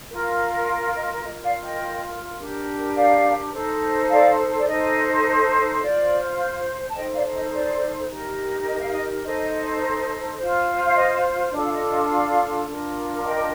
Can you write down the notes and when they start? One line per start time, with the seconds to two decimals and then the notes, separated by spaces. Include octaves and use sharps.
0.10 F4 A#4
0.96 D#5
1.24 F4 A#4 D#5
1.44 D5 F5
1.62 D#5 G5
2.39 D4 G4 A#4
2.95 D5 F5
3.53 D#4 A4 C5
4.10 D5 F5
4.58 D5
4.66 D#4 A4 C5 D#5
5.81 F4 C5 D5
6.88 A5
6.95 D#4 A4 C5 D#5 G5
7.14 D5 F5
7.34 D#5
7.53 D5
8.09 D#4 G4 A#4
8.67 D#5
8.80 F5
8.92 D#5
9.24 D#4 A4 C5 D#5
10.38 F4 C5
10.85 F5
10.95 D#5
11.52 D4 F4 A4 D5
11.65 F5
11.72 D#5
11.91 D#5
12.09 D5 F5
12.67 D4 F4 A#4
13.24 D#5 G5